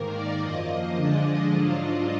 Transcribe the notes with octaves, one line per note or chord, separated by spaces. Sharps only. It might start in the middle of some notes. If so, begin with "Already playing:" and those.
Already playing: G#2 D#3 A#3 A#4
D5
F#2 F3 A#3 D#5
D3 F3 G#3 D4
G#2 F#3 D4 F4